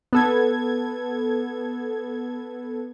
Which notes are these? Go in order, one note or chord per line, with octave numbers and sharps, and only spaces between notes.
B3 A4 G#6